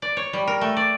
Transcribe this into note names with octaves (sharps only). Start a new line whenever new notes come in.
D5
C#5
G3
A#4
A3
D5